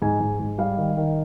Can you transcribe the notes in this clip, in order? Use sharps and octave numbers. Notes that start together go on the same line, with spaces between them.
G#2 G#5
G#2
G#2
G3 F5
D#3
D#3